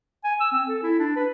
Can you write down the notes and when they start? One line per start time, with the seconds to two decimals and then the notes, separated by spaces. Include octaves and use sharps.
0.24 G#5
0.41 E6
0.52 C4
0.68 A4
0.83 E4
0.99 D4
1.16 B4